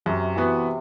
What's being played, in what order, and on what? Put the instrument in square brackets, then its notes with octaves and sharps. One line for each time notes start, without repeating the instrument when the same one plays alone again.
[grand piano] F#2 [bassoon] C3
[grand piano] E3 B3 F#4